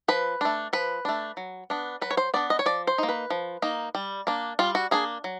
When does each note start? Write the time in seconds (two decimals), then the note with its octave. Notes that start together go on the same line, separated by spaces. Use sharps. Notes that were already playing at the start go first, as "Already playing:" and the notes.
0.08 F3 B4
0.41 A3 D4
0.73 F3 B4
1.05 A3 D4
1.37 F#3
1.70 B3 D4
2.01 F#3 B4
2.11 C#5
2.17 C5
2.34 B3 D4 D5
2.50 D#5
2.59 C#5
2.66 F3 D5
2.87 C5
2.98 A#3 D#4
3.09 B4
3.30 F3
3.62 A#3 D#4
3.95 G3
4.27 A#3 D4
4.59 G3 F4
4.75 F#4
4.91 A#3 D4 G#4
5.24 F#3